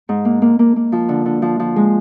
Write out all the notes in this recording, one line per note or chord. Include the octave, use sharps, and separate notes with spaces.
G#2
A#3
A#3
A#3
A#3
F3
D3
D3
F3
F3
G#3